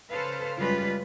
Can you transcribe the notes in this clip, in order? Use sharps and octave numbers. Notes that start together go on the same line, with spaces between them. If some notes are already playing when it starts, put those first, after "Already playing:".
C#3 A4 B4 C5 F5
F#2 C#3 G3 G#3 F4 B4